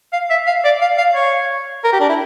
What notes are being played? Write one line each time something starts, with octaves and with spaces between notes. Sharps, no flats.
F5
E5
F5
D5
F5
F5
C#5
A#4
G4
D4
E4